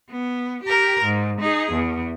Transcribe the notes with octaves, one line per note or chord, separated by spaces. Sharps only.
B3
G4 A#4
G#2
D#4 G#4
E2